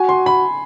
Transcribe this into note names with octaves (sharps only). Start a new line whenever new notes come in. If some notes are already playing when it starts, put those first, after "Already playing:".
Already playing: F#4 G#5
C6
B5